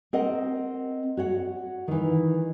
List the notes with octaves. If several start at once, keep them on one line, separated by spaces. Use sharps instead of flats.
C4 A#4 D#5 F#5
F#4 C#5 F#5
D#3 E3